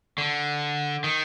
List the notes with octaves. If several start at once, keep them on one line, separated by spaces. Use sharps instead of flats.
D3
D#3